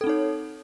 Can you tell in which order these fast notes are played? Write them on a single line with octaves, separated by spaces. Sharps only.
A4 C4 D#4 C#5